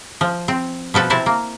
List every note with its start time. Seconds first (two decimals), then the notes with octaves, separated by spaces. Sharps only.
0.21 F3
0.48 C4
0.94 B2 F3 A4 B4
1.10 C3 C4 E4 A5
1.26 A#3